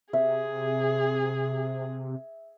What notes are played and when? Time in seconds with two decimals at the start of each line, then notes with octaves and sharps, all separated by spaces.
0.13 C3 G#4 E5